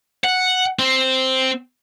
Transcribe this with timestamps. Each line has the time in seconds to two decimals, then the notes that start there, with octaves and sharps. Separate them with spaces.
0.24 F#5
0.79 C4